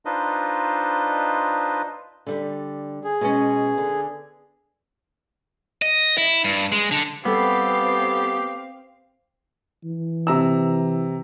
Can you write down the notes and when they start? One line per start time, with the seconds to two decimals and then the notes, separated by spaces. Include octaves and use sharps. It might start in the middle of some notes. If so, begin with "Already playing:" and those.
0.05 D4 D#4 F4 B4 C5 D#5
2.26 D3 G3
3.04 G#4
3.21 B2 G#3 C#4
3.78 D3
5.82 D#5
6.18 E4
6.44 G2
6.72 G#3
6.91 D3
7.25 G3 B3 C4 G4 A4 F5 C7
9.84 E3
10.27 C3 A#5 E6